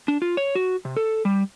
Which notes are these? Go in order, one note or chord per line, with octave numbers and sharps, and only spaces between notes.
D4
F4
C#5
F#4
C3
A4
G3